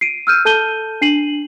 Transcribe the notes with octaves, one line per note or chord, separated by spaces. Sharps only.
C7 D7 D#7
E6 F6 G6 D#7
A4 A5 G6 D#7 G7
D4 C7 D#7 F#7